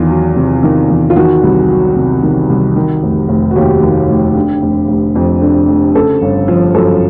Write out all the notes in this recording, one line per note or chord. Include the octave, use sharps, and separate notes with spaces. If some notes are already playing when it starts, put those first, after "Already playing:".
Already playing: E2 D#3 F4
F#3
C3
D#3
E2
F4
D#3 F#4
C2
F#3
C3
D#3
C2
D#3
F1
F1
F#4
D#2 G4
D#3
F1
D3
F1
F1
F2
D3
F1
C#3 A4
G1
F3
F#2 A4